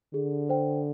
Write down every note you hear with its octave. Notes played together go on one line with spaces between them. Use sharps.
D3 G#4
C5 G5